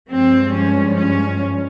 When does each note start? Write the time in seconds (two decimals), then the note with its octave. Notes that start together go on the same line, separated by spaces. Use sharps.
0.11 G2 F3 G#3 C4
0.54 C#4
0.97 C#4